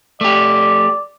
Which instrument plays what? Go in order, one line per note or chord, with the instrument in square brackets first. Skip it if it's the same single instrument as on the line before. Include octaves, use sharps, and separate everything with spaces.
[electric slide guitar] A3 G4 [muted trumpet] D5